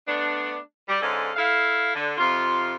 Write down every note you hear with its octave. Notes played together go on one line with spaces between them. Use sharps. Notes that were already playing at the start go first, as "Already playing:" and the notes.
A3 B3 D4
G3
G#2 D3 C#4 A4 F5
E4 A4 F5
D3
F2 C3 F4